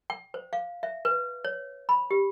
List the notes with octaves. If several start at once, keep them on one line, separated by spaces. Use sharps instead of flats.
G5
C5
F5
E5
B4
C#5
B5
G4